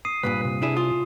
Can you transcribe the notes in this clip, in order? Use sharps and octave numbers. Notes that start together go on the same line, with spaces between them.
D#6 C7 D#7
C2 G2 A#2 B4
C3
D4 E4 G#4
F4 D#6